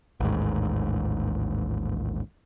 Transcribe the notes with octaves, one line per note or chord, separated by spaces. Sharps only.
A1 D#2 G#2